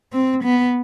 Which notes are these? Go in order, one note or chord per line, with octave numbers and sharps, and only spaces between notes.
C4
B3